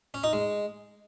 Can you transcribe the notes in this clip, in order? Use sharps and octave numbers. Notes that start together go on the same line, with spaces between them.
C#4
D#4
G#3